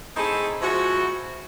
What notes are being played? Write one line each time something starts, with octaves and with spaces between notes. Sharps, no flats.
A3 C4 D#4 E4 G#4 A4
F3 G#3 E4 F#4